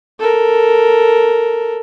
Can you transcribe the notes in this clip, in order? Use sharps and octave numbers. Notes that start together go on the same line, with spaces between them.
A4 A#4